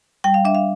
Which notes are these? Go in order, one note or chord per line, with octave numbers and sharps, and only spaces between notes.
G3 G5
F5
D4 E5
F5